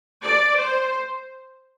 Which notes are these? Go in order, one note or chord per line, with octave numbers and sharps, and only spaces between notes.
D5
C5